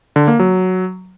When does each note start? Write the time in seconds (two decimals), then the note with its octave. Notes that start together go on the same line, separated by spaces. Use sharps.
0.16 D3
0.28 A#3
0.39 F#3